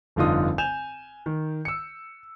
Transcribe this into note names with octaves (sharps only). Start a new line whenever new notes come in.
F1 G2 D3 D#4 F4 D#6
G#5 G6 E7 F7
D#3
E6 C#7